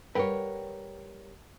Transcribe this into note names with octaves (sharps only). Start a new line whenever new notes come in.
G3 A#4 B4 C#5 F#5 G5